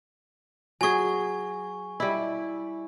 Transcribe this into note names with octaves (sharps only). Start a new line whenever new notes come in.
F#3 G#4 G#5 C#6
G3 E4